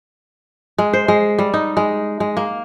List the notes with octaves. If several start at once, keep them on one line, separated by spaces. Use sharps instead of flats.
G#3
C5
G#3
G3
D#4
G#3
G#3
A#3